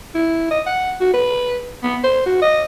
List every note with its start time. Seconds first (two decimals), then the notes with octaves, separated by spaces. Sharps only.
0.15 E4
0.51 D#5
0.66 F#5
1.00 F#4
1.14 B4
1.84 B3
2.04 C5
2.26 F#4
2.42 D#5